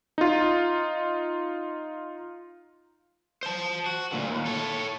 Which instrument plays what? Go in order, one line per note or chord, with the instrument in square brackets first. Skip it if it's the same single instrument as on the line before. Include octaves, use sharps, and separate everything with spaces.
[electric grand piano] D#4 F4
[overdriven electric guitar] C5 A5
F#4
D2 A#2
D#2
A4 C#5